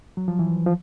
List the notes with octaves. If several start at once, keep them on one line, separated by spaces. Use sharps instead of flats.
F#3
F3
E3
F3